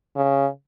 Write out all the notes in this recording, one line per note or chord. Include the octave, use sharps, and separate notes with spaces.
C#3